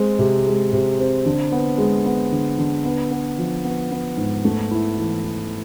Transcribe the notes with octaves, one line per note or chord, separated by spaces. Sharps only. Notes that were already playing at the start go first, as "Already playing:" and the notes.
Already playing: G#3 C4
C3
G#3
C3
C4
D3
B3
G#3
B3
D3
D3
B3
B3
F3
B3
B3
G#2
A3
E4
E3
E4